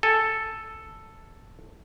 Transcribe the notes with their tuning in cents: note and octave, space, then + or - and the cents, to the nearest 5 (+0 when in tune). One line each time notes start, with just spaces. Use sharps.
A4 +0 G#5 +0